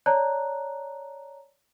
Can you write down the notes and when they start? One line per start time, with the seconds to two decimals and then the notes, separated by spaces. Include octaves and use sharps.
0.06 C#5 D5 A5 A#5 F#6